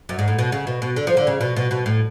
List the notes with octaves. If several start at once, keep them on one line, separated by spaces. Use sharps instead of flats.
F#2
G#2
A2
B2
C#3
B2
B2
D3
F3
D3
C#3
B2
B2
B2
A2